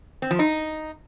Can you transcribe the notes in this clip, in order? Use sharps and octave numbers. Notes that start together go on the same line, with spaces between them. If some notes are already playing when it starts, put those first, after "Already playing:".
C4
F3
D#4